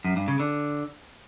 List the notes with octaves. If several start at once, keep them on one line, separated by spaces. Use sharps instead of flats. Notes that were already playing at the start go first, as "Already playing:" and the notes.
F#2
G2
C#3
D3